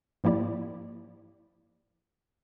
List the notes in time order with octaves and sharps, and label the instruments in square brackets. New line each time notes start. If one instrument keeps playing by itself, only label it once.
[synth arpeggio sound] G#2 F3 A#3 E4 G4 D5